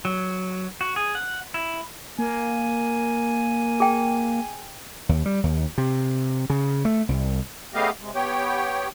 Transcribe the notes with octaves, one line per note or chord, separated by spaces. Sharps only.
F#3
F#4
G#4
F#5
E4
A#3 G#5
G#4 G5
D#2
G3
D#2
C3
C#3
A3
C2
C#3 A3 B3 G4 D#5 F5
C3 G#3
B3 G4 C#5 G5